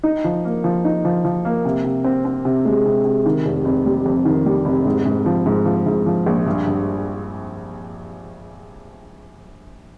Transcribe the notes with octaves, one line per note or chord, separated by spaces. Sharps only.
D#4
F3
A#3
F3
D#4
F3
F3
A#3
C3
C3
C4
C4
C3
G#3
C3
C3
D#3
F1
F1
G3
F2
D#3
G3
F1
G#2
G#2
F3
G#2
F3
G#2
F3
A#1
G2
G2